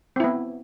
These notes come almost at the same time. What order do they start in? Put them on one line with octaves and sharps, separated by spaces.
C4 E4 B3